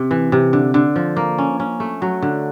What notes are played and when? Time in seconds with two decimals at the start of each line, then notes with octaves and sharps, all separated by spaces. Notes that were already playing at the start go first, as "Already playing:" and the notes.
Already playing: C3
0.11 E3
0.32 C3
0.53 D3
0.74 D3
0.96 F3
1.17 A#3
1.38 C#4
1.60 C#4
1.80 A3
2.02 F#3
2.22 D3